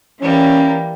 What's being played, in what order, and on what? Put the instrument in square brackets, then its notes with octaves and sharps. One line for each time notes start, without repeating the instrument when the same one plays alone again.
[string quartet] E3 G3 A#3 [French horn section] C#4